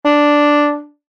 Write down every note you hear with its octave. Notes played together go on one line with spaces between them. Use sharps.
D4